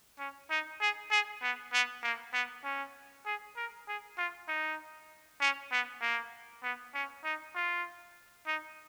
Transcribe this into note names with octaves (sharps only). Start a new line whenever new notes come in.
C#4
D#4
G#4
G#4
B3
B3
A#3
B3
C#4
G#4
A#4
G#4
F4
D#4
C#4
B3
A#3
B3
C#4
D#4
F4
D#4